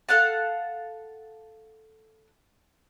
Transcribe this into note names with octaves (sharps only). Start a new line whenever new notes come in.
A4 F5 F#5 A5